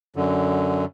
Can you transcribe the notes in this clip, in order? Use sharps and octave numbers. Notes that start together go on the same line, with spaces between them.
F#2 D3